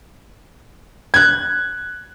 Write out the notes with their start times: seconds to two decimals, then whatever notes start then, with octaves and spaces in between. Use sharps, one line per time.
1.14 F#6 G#6